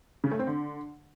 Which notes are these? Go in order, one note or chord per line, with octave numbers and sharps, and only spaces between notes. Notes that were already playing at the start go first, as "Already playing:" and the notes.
C#3
A3
C4
D3